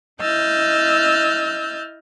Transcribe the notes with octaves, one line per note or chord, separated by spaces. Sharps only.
E4 D#5 E6 F6 G6 A6